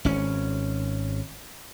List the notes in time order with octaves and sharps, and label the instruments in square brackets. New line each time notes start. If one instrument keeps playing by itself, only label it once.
[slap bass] G#1 C#4